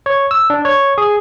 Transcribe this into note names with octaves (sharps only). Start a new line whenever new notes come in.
C#5
E6
D4
C#5
G#4